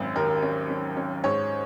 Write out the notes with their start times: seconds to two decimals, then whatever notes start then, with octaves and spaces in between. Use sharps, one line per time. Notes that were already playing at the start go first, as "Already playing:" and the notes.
Already playing: G#1 F#2
0.15 D#2 A#4
0.42 C#4
0.70 C#4
0.97 C#4
1.24 G#2 C#5